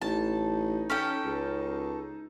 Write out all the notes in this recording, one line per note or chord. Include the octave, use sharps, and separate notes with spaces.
A1 D#4 A5
C#4 A4 G5
C#2